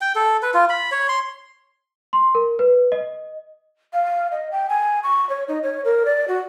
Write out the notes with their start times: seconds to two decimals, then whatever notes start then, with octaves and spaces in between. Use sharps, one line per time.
0.01 G5
0.15 A4
0.43 B4
0.54 F4
0.69 B5
0.92 C#5
1.09 C6
2.13 C6
2.35 A#4
2.59 B4
2.92 D#5
3.93 F5
4.32 D#5
4.51 G5
4.69 G#5
5.03 C#6
5.29 C#5
5.48 D#4
5.63 C#5
5.85 A#4
6.05 D5
6.28 F#4